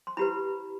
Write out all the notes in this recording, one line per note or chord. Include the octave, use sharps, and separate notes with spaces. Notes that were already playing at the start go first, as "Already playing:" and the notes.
C6
E4 G4 B4 B5